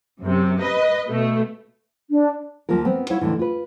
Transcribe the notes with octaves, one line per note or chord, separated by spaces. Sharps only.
F#2 C3
B4 D#5
B2 A3
D4
D#2 F3 A#3 F4 A#4
B3 C4
E4 C#5 F5 F#5
F2 A2 D3 E3
F4 B4